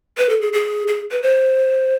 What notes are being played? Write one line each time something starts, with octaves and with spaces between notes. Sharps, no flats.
B4
A4
G#4
G#4
G#4
B4
C5